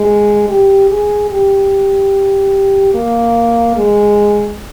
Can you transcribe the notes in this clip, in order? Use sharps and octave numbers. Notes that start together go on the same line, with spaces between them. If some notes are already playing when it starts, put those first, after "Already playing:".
Already playing: G#3
G4
G#4
G4
A#3
G#3